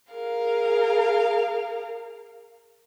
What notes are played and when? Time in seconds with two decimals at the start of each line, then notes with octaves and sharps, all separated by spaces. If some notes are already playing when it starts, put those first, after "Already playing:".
0.13 G#4 A#4 F5